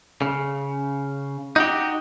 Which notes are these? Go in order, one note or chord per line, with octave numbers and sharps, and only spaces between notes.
C#3
D#4 F#4 G4